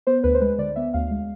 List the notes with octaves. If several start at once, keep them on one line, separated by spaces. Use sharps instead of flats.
B3 C5
D2 B4
C5
G#3 B4
D3 D5
B3 E5
D2 F5
G#3